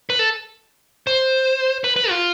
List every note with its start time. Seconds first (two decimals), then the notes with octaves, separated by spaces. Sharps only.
0.10 B4
0.19 A4
1.07 C5
1.84 B4
1.96 B4
2.10 F4